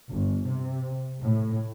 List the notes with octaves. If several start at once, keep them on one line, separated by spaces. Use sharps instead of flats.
G1
C3
A2